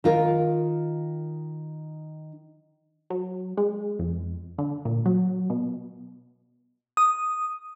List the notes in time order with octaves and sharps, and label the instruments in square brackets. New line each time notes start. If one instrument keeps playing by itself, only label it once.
[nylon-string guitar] D#3 F4 A#4
[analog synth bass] F#3
G#3
F2
D3
A#2
F#3
B2
[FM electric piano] D#6